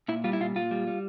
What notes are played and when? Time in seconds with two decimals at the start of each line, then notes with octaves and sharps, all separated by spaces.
0.08 A#2 E4
0.24 G3 F4
0.33 E4
0.41 A#2 F4
0.56 A#2 F4
0.71 G3
0.88 G3